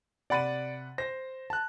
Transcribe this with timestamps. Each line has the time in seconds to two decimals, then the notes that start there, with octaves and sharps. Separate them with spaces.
0.30 C3 D5 F#5 B5 A6 D#7
0.98 C5 A#6
1.50 A5 F#6